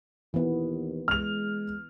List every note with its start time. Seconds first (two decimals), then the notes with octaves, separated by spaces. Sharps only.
0.34 D#2 E3 B3
1.08 G#3 F6 F7